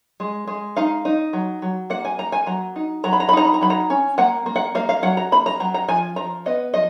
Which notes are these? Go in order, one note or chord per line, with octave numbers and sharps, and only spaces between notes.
G#3
G#3
D#4 F5
D#4
F#3
F#3
A#3 F#5
G#5
A#3 A#5
G#5
F#3 A#5
D#4
F#3 A#5
B5
A#5
B5
D#4 A#5
B5
A#5
F#3 B5
A#5
C#4
A#3 F#5
A#3
F#5
A#3 F5
F5
F#3 F#5
A#5
A#3 B5
A#5
F#3 A#5
A#5
F3 G#5
F3 A#5
B3 D#5
F3 D#5